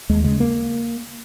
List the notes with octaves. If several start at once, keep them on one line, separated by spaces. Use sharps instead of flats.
D#2 G#3
C#3 G#3
A#3